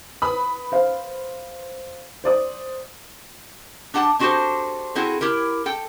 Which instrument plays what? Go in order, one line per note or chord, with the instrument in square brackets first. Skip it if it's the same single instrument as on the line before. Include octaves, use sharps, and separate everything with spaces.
[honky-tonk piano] B4 B5 D#6
[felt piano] C5 F5
C5 D5 D#6
[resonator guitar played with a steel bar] D4 G4 F#5 A5
C4 D4 F#4 G4 A4 C5
C4 E4 F#4 G#4 A4
E4 G4 A#4
A4 G5